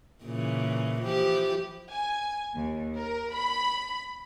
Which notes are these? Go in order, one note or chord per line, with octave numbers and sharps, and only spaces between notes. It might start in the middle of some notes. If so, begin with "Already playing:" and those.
A#2 C#3 E3
E3 F3 G4
G#5
D#2
A#4
B5